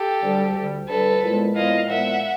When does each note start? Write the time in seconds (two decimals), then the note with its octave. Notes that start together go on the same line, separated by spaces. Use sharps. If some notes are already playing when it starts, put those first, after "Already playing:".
Already playing: G4 A4
0.21 D2 D3 G3
0.54 D2 D3 G3
0.88 D2 D3 G3 A4 B4
1.21 A#2 F3 G#3 B3 E4
1.55 A#2 F3 G#3 B3 E4 D#5 F5
1.89 A#2 F3 G#3 B3 E4 E5 F#5